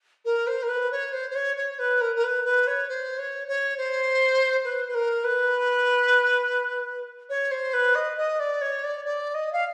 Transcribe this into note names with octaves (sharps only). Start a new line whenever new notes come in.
A#4
C5
A#4
B4
C#5
C5
C5
C#5
C#5
B4
A#4
A#4
B4
B4
C#5
C5
C#5
C#5
C5
B4
B4
A#4
B4
C#5
C5
B4
D#5
D#5
D5
C#5
D5
D5
D#5
F5